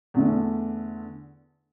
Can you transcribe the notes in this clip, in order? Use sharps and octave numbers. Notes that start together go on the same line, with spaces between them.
E2 D3 A3